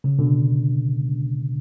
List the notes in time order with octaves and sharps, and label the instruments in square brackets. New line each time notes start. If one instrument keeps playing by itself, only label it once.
[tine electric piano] C#3
B2 D3